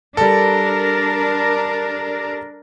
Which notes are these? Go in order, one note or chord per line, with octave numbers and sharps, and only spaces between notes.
G3 D4 A4 A#4